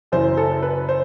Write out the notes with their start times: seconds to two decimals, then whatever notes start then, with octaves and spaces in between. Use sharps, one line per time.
0.12 F#1 F#2 E3 C5
0.37 A4
0.62 B4
0.89 C5